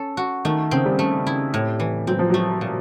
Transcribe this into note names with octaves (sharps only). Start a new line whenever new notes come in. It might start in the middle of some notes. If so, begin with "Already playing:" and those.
Already playing: C#4 A4
F#4
D#3 A3
C#3 C4
G3
A3
E4
A2
E3
F#3 C4
F3
F#3 A3
A#2